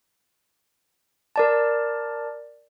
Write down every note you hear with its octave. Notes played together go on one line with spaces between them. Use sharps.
A#4 D5 A5